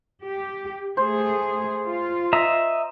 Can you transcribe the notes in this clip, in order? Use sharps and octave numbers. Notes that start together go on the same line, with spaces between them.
G4
A3 G#4 C5
F4
D#5 E5 A#5